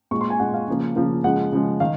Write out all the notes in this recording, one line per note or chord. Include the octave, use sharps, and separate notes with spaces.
A#2 G#3 C#6
C6
G#5
A#2 G#3 F#5
F5
C#3 F3 A#3
C#3 F3 A#3
C#3 F3 G#3 F#5
C#3 F3 G#3
D#3 F5